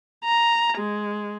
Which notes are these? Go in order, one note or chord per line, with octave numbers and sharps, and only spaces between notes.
A#5
G#3